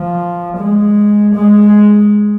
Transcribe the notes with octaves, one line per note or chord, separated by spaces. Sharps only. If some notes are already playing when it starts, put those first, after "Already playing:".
Already playing: F3
G#3
G#3